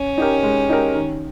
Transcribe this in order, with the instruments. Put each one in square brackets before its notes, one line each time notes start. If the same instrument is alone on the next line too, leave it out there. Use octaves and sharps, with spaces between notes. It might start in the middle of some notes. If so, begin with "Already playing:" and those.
Already playing: [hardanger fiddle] C#4
[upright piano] D#4 G4 A#4
G#3
D#4 G4 A#4
D#3